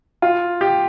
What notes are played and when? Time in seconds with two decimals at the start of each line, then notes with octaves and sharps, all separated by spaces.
0.22 F4
0.61 G4